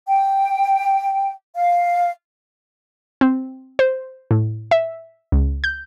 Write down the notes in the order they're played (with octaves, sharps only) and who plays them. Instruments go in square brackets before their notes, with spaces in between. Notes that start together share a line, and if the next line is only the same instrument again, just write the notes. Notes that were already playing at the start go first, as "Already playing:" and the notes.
[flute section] G5
F5
[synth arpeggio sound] C4
C5
A2
E5
C#2
G6